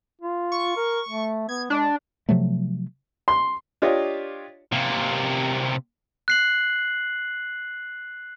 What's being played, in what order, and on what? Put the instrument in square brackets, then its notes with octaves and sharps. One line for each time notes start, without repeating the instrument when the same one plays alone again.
[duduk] F4
[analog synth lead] C#6
[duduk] A#4
A3
[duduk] B3 [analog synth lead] G#6
[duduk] G#3 [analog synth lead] D4
[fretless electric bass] C3 F3 F#3 A3
[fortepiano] C6
D4 F4 G4 C#5 D#5
[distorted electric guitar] C3 A#3
[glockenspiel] F#6 C7 F#7